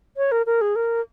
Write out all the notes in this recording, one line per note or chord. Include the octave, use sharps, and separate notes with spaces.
C#5
A#4
A#4
G#4
A#4